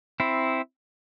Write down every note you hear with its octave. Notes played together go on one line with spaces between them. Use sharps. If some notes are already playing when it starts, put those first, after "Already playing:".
C4 E4